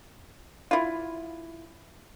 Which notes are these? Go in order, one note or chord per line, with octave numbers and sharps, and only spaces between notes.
E4 F4